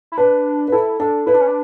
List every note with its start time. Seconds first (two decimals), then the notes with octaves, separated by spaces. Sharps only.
0.12 E4
0.17 D4 B4
0.68 B4
0.72 E4 A4
1.00 D4 A4
1.26 E4 B4
1.34 D4
1.41 C#4
1.48 D4